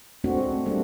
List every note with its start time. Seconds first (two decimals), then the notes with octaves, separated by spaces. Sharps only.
0.24 G#3 A3 C4 D4 F#4
0.66 G3 A3 A#3 D4